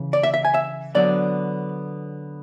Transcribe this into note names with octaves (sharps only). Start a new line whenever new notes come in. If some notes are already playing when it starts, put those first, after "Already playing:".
Already playing: C#3 E3
D5
E5
E5
G#5
E5
D3 F#3 B3 D4 D5